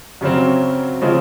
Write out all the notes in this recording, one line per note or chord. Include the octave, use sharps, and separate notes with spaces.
F#2 C#3 F#3 C4
C#3 F3 G#3 C4